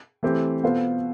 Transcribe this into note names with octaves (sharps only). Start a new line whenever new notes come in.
E3 A3 C4 G4
B2 B3 F4 A4 C5